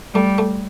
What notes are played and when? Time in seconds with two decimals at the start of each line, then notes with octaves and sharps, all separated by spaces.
0.14 G3 A3
0.38 A3